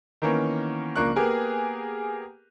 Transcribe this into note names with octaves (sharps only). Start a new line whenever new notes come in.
D#3 E3 A#3 B3 C#4
C#2 F3 A#3 D4 C#6 F#6
A#3 B3 G4 G#4 A#4